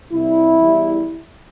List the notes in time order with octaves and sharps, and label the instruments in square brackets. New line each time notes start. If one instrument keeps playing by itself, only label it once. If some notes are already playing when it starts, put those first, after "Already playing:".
[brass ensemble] C2 C3 G3 E4
E2 E3 G3